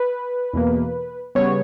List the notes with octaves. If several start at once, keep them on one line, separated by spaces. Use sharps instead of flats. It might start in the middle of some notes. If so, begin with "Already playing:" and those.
Already playing: B4
E2 B2 A#3
C#3 G3 B3 C#5